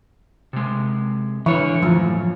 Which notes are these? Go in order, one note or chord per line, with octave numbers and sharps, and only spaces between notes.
C3 G#3
D3 E3 C#5
F#2 A2 F3